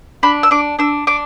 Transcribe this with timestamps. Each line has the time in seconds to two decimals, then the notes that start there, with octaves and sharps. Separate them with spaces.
0.23 D4 B5
0.43 E6
0.51 D4 D6
0.79 D4 E6
1.07 D4 D6